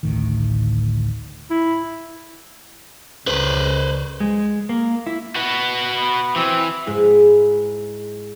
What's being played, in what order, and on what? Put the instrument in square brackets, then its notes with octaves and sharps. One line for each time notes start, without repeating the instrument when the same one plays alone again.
[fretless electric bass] A1 D2 A2 D#3
[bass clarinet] E4
[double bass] C#2 [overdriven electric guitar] B4 C5
[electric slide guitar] G#3
A#3
E4
F#4 B4
[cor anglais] B3
[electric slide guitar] E3 [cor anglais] C4
[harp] G#2 G#3 E4